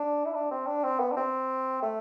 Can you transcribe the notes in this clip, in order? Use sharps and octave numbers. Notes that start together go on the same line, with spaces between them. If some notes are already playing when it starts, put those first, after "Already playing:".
Already playing: D4
E4
D4
C4
D4
C4
B3
D4
C4
A3